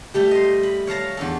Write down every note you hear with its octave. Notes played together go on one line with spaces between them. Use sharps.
G3 A3 G4
D#5 C6
B5
C#5 F5 A5 A#5
E2 D4 A4